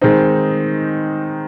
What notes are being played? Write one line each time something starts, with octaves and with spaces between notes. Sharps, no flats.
D#3 G#3 C4 D#4